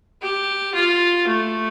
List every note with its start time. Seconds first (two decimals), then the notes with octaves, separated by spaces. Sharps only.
0.22 G4
0.74 F4
1.27 A3